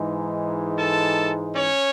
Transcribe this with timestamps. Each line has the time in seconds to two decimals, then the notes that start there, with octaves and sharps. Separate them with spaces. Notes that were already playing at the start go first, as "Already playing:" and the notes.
Already playing: G#2 E3 G#3 D#4
0.78 A4 A5
1.55 C#4 C#5